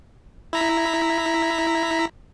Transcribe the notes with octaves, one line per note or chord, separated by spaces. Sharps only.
E4 A#5 B6